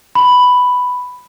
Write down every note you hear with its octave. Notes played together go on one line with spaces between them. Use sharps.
B5